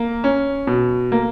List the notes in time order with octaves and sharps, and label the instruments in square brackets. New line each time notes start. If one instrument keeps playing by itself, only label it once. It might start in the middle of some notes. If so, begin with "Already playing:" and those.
Already playing: [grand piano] A#3
C#4
B2
A#3